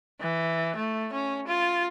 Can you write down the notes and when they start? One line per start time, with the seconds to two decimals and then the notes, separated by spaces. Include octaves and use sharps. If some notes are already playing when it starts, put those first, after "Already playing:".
0.21 E3
0.76 A3
1.13 C#4
1.48 F4